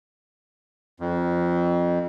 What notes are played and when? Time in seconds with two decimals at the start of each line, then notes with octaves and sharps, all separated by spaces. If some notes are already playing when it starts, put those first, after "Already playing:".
1.00 F2